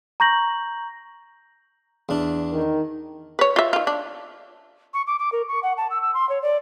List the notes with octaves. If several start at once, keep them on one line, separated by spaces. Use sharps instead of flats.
A#5 C#6 G6 A#6 F#7
E2 D4
D#3
B4 C#5
F4 E5
D#3 F4
D4
C#6
D6
D6
A#4
C#6
F#5
A5
E6
E6
C6
C#5
D5